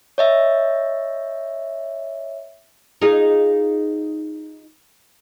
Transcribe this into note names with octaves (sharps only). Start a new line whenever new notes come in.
C#5 D#5 E5
D#4 F4 G#4